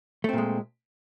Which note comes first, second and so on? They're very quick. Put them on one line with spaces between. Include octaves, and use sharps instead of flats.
A3 C4 A#2 G#3